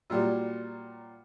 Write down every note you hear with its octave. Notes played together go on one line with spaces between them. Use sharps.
A#2 F#3 G3